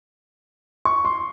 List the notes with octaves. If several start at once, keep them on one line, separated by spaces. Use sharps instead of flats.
C#6
C6